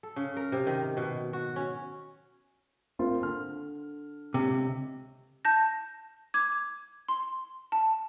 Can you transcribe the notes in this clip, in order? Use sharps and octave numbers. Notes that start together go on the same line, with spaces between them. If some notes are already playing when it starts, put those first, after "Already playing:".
A4
C#3
A#4
C3
D#3
B2
F#4
C#4
A#3 C4 F4
D3 F6
C#2 C3
A5 G6 A#6
D6 G#6
C6
A5